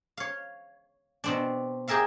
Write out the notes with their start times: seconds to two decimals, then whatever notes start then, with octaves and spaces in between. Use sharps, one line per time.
0.17 C#5 F5
1.24 B2 C4 D4
1.88 G4 G#4 A#4 E5 F5